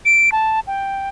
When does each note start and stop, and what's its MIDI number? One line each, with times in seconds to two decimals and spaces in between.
0.05 0.30 98
0.32 0.60 81
0.67 1.09 79